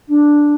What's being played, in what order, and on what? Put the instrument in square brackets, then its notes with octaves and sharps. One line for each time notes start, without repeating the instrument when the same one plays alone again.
[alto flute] D4